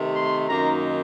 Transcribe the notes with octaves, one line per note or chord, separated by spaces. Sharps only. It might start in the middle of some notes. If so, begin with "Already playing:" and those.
Already playing: C3 D#3 A3
C6
F#2 D#3 A#3 D#4 A#5